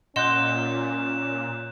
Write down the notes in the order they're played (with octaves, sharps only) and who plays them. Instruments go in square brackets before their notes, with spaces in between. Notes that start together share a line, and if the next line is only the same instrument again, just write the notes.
[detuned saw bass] A#2 [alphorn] C#4 [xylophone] D#5 F#5 C6 [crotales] F#6 G6 E7